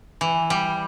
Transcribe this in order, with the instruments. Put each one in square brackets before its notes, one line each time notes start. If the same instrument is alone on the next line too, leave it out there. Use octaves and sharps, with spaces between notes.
[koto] E3
G3